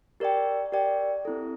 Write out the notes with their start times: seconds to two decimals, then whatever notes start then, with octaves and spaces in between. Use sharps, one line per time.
0.20 G4 A#4 D5 G5
0.72 G4 A#4 D5 G5
1.25 C4 E4 A4